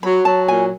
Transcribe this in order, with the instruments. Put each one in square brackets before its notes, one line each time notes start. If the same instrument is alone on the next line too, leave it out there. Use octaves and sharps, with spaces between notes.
[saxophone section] F#3 [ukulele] B5
[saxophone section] F#3 [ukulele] A5
[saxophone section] A#2 [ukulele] G#5